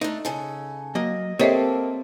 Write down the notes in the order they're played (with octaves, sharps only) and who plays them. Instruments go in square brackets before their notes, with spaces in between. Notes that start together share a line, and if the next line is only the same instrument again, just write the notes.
[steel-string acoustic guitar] A3 D4 [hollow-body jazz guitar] D#4
[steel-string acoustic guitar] C#3 A4
[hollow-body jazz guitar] F#3 A#3 [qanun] D#5
[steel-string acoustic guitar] A#3 [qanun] C4 A4 [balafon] G4 D#5 E5 [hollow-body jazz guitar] C#5 A5